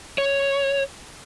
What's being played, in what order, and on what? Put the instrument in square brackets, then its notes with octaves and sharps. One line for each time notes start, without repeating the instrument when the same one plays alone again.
[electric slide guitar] C#5